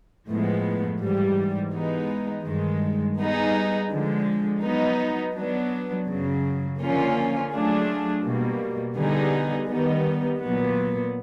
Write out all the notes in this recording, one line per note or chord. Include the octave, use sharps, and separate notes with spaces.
A2 F3 G#3 B3
G#2 E3 G3
E3 G#3 B3 D#4
G2 D#3 G#3
G3 B3 D#4 G#4
D3 F3 G#3
F#3 B3 D#4
F#3 B3 D4
F#2 C#3 F#3
D3 F3 A#3 C#4 F4
F#3 A3 D4 F4 G#4
B2 G3 A#3
D3 G3 B3 D#4 G#4
D#3 G3 B3 D#4
A#2 F#3 B3